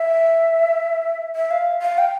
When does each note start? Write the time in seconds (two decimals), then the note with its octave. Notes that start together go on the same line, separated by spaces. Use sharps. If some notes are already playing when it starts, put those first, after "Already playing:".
Already playing: E5
1.36 E5
1.51 F5
1.82 F5
1.98 G5